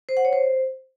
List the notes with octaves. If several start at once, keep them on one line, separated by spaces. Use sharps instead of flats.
C5
F#5
C#5
C5